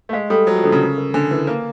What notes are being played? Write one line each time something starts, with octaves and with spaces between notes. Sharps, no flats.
A3
G#3 F5
G3 A4
F#3 C5
F3
D3 A4
C#3
A#4
A#4
D3 G#5
E3 A#4
A#3 B4